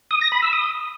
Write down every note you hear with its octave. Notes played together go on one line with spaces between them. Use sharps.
D#6
A#6
B5
E6
D#6